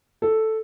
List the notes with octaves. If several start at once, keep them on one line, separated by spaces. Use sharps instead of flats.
A4